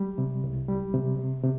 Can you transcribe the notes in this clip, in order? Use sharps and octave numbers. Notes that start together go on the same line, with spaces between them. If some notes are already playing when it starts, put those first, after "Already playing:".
Already playing: G3
C3
C2
G3
C3
C3
C3